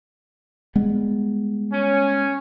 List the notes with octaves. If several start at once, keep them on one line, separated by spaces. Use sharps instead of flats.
G3 G#3 B3
C#4